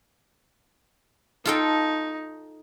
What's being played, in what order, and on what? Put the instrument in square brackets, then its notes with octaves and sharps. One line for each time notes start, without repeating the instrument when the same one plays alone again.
[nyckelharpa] D#4 [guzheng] F4 A4 G5